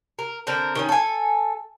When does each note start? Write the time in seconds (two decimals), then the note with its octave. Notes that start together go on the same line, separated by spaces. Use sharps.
0.19 A#4
0.47 D3 C4 A#4
0.75 D#3 C4 C#4
0.89 A4 G#5